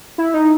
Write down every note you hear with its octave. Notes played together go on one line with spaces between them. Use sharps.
E4
D#4